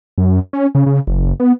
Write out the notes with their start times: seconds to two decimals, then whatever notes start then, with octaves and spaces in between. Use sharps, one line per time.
0.18 F#2
0.53 C#4
0.75 C#3
0.86 C#3
1.07 F#1
1.40 B3